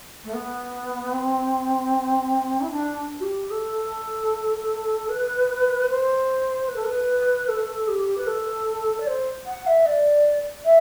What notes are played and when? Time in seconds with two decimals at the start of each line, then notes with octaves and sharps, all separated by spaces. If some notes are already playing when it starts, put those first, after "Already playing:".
0.24 A3
0.34 B3
1.13 C4
2.61 E4
2.71 D4
3.20 F#4
3.24 G4
3.50 A4
5.09 B4
5.89 C5
6.68 B4
6.76 A4
6.85 B4
7.48 A4
7.88 G4
8.18 B4
8.27 A4
9.00 D5
9.07 C5
9.46 F#5
9.67 E5
9.86 D5
10.65 E5